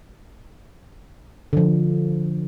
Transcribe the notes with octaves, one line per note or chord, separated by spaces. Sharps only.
D3 F3